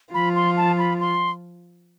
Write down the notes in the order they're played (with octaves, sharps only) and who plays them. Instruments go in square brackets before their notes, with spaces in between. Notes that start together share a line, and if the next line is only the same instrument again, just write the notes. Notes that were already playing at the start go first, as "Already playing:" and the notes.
[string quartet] F3 F4 [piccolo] B5
[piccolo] C6
A5
B5
C6